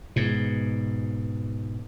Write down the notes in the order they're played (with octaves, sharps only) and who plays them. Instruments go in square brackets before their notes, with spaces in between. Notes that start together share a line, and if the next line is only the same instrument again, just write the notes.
[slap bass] G#2 B2